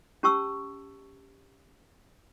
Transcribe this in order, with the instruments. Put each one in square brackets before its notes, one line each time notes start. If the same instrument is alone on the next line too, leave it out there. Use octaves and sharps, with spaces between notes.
[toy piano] C#4 G4 A5 C#6 E6